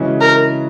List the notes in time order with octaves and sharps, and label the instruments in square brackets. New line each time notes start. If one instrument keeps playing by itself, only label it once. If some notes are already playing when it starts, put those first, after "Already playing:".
Already playing: [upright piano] C#3 E3 G#3 C#4 F#4
[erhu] A#4